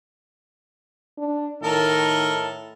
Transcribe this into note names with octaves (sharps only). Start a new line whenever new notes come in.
D4
A2 D#3 A4 A#4 D#5